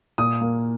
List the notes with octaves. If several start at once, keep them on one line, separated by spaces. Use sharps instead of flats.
A#2 D#6
A#3